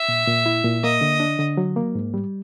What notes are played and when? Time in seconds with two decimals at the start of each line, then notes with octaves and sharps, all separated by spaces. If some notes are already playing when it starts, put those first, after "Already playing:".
Already playing: E5
0.09 A#2
0.27 A#2
0.46 E4
0.64 A#2
0.83 A#3 D#5
1.01 D3
1.20 D4
1.39 D3
1.57 F#3
1.76 A#3
1.95 G#2
2.14 G3